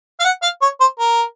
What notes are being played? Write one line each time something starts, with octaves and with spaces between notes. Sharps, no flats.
F5
F#5
F5
C#5
C5
A#4